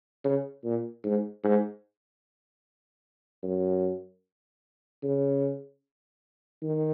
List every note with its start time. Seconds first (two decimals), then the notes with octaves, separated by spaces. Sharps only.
0.24 C#3
0.64 A#2
1.04 G#2
1.44 G#2
3.43 F#2
5.03 C#3
6.62 D#3